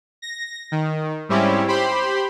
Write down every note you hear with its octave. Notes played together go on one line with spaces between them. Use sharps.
A#6
D#3
G#2 G3 C4 C#4 E4 G4
G4 C5 B5 C6